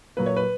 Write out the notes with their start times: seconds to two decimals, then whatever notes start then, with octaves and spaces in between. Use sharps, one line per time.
0.17 A#2 F#3 A#3 B4
0.26 C#5
0.37 B4